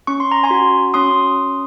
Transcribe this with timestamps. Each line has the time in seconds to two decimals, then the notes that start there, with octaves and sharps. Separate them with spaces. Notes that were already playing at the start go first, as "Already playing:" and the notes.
0.07 C#4 C#6
0.20 C6
0.32 A#5
0.43 G#5 C6
0.51 F#4
0.94 C#4 C6 D#6